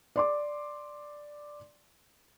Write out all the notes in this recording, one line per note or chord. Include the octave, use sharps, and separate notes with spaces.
D5 C6 D6